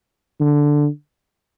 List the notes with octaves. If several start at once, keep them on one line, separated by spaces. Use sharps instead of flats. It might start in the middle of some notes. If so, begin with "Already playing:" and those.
D3